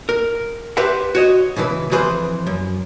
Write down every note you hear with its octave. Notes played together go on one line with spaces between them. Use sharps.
A#4
G4 B4 C5 E5 F#5
F#4 C#5 D#5
C#2 B2 E3 B4
F2 E3 G#4 B4 C5
F#2